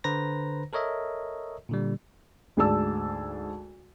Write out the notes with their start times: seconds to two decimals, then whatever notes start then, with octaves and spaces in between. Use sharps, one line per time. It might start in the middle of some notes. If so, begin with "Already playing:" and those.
0.04 D3 B4 C5 A#5 A#6
0.73 A4 A#4 C#5 D#5 E5
1.69 A#2 D3 G3
2.57 D2 G#2 G#4 D5 A5 E6